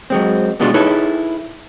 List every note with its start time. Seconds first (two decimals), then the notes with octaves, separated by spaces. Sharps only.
0.10 F#3 G#3 C4
0.60 G2 B2 G#3 D4 F4 F#4
0.74 D#4 E4 G#4 A4 B4 C#5